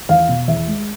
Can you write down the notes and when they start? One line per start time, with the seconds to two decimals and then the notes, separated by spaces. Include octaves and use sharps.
0.09 E2 F5
0.29 B2
0.48 E2 E5
0.67 G#3